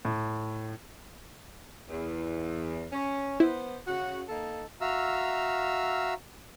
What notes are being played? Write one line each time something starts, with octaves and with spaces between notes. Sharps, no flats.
A2
E2
C#4
B3 E4 C5
C#3 F#4
A#3 D#4 A4
F#4 E5 F5 A#5 E6 F6